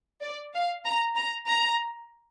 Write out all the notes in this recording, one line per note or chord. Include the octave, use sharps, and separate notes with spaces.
D5
F5
A#5
A#5
A#5